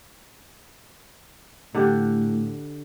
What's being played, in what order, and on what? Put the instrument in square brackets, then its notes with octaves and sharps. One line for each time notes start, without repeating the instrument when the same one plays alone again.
[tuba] A2 [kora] D3 D4 G4